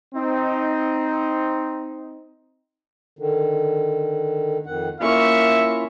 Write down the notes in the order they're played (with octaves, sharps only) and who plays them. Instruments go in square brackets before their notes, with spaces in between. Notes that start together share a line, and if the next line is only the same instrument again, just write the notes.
[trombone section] C4 D#4
[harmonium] D3 D#3
F2 D#3 F#5
[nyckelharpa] A#3 C#6 [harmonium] C#4 E4 F4 [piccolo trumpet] E5